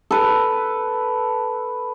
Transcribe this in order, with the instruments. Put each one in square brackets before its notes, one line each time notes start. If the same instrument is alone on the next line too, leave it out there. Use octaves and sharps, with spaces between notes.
[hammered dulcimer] A4 B4